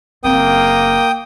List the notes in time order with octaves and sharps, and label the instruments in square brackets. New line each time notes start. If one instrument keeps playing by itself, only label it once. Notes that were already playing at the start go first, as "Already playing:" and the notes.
[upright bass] F#1 C4 [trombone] A#3 [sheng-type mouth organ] G5 D#6